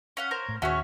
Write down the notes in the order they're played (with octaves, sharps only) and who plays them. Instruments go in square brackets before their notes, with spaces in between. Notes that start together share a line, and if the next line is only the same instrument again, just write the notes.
[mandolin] C#4 F5 F#5
A#4 C5 C#5
[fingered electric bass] A2
[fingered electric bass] D#2 [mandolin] C#4 G#4 C#5 [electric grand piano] F#4 E5 F#5